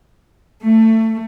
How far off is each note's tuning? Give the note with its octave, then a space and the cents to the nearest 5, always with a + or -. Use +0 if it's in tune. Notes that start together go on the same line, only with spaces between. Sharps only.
A3 +20